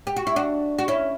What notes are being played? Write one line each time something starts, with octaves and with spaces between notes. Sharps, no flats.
G4
F#4
E4
D4 F#4
F#4
C#4 E4